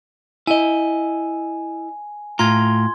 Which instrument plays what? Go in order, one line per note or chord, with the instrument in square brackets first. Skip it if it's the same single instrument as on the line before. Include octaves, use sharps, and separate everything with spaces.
[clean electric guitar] E4 D#5 [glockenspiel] G#5
[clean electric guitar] A2 F4 A#5 [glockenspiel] C6 G#6